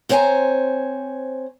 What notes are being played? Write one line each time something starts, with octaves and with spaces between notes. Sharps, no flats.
C4 C5 C#5 F#5 G#5 A#5